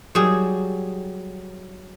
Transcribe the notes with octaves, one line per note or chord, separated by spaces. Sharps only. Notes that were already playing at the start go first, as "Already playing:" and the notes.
F#3 G3 G#4